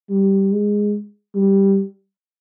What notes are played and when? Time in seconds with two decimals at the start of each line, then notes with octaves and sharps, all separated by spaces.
0.10 G3
0.52 G#3
1.35 G3